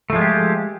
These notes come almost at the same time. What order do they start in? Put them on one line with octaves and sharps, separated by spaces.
A3 F3 G#3 F4 G4